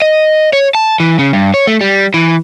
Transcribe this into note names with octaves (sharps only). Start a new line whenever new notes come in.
D#5
C#5
A5
E3
C#3
G2
C#5
A3
G3
E3